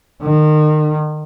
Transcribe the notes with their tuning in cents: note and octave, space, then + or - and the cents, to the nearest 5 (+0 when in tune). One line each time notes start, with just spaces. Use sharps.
D#3 -30